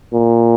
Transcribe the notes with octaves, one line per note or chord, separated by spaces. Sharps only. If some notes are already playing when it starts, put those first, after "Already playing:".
A#2